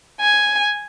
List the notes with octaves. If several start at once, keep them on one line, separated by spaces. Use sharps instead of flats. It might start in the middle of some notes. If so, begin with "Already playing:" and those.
G#5